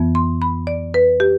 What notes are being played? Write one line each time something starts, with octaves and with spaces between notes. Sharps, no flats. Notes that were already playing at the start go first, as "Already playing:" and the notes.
Already playing: F2 E3 B3
C6
B5
D5
B4
G4